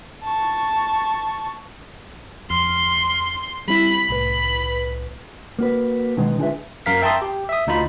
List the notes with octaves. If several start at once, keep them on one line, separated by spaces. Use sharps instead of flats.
A5 C#6
F2 C6 F6
G3 C4 E4 B5
C2 A2 B4 B5
A#3 F#4 B4
B2 D3 D#3 F#3 G#3 B3
D4 F4 G#4 A4 B4 E5
F#2 A#4 F5 B6
E5 G5 A5 A#5 C6 D#6
G4
E5 D#6
D2 D#4 F4 B5